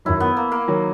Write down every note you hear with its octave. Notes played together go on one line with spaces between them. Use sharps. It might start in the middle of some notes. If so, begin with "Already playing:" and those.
F#2 D#3 F#3 E4
B3
A#3
A#3
D#3 F#3